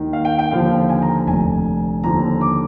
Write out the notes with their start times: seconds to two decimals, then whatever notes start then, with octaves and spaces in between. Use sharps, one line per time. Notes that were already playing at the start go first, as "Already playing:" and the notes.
Already playing: D#2 D#3
0.13 F5
0.25 G5
0.39 G5
0.51 D#2 D3 F3 F5
0.89 G#5
1.02 A#5
1.27 F1 F2 D3 G#5
2.04 D#2 D3 F3 A#5
2.41 D6